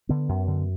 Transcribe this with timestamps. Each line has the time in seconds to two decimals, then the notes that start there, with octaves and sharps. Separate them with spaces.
0.09 D3 B3
0.29 F#2
0.48 D3